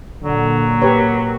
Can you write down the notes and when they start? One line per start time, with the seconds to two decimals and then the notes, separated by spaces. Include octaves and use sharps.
0.23 A#2 D3 F#3
0.82 G4 A#4 B4 C#5